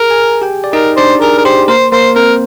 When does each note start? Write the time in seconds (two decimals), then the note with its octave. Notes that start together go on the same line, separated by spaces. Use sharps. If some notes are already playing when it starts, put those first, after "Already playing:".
Already playing: G#4 A#4
0.11 G#4 G#5
0.42 G4 G5
0.64 D5
0.73 D#4 A#4 D#5
0.97 D4 C5 D5
1.22 G#4 A#4
1.38 A#4
1.45 G4 C5
1.68 A#3 A#4 C5
1.92 A#3 A#4 C5
2.16 C4 A#4 C5